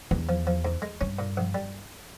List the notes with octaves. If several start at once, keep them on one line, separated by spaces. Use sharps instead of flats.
E2 G2
F3
F3
G#2
G#3
G2 C#4
A#2
A#1
G3